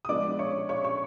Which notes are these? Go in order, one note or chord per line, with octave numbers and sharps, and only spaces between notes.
D#6
F3 G#3 B3 D4 D5 D6
C#5 C#6
C#5 C#6
C#5 C#6